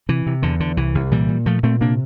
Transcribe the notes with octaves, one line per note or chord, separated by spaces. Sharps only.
C3 E3
C3
E2 D3
E2 D3
C2 E3
C2
A#2 E3 G3
A#2
A#2 F3 A3
A#2 A3 C4
C3 A#3 D4